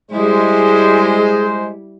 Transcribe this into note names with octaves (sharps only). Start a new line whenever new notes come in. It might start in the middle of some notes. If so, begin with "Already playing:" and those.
G3 G#3 E4 G#4 C5